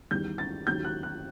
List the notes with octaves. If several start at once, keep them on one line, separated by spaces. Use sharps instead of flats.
E2 D#3 G3 G6
A6
D#2 D#3 F#3 G6
F#6
F#6